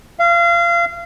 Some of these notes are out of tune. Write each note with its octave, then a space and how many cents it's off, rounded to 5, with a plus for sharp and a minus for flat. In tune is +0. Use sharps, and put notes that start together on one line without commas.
F5 -30